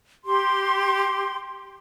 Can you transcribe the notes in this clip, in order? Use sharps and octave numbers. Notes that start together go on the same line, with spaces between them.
G4 C6